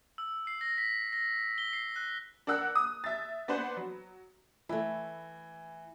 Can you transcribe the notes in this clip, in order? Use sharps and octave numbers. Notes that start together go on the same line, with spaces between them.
E6
C7
A#6
B6
A#6
G7
C7
F#6
D4 A#4 F#5 E6 F#6
D#6
E5 A6
B3 D4 B4 C5 F#5
F#3
E3 A3 E4